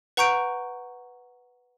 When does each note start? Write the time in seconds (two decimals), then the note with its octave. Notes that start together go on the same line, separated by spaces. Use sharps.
0.17 B4 F#5 A#5 C#6 G6 D7